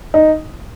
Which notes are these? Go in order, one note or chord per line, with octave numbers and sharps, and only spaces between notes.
D#4